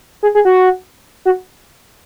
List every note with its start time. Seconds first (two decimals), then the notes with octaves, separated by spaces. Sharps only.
0.23 G#4
0.35 G#4
0.45 F#4
1.25 F#4